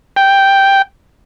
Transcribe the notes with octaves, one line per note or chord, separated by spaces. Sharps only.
G5